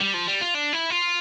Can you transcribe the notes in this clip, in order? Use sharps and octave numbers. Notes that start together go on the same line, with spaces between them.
G3
F3
G3
F4
D4
E4
F4